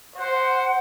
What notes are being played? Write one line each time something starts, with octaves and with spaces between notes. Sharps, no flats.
C5 F#5